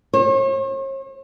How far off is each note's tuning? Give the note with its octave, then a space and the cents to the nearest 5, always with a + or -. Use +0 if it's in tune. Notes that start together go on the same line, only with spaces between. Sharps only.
C#5 -45